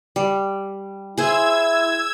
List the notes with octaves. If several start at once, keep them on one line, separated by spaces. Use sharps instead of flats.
G3
E4 G#4 C5 E6 G#6